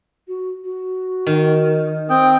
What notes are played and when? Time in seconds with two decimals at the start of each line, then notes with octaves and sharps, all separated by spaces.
0.28 F#4
0.64 F#4
1.27 D#3
2.10 C4 G5 D#6